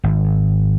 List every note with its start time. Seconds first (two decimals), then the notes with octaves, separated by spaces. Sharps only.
0.04 G#1